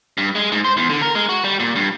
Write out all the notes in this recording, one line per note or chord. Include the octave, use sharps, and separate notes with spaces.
G2
G#3
G#2
C5
E2
D3
A#4
G#3
F#4
G3
A#2
G2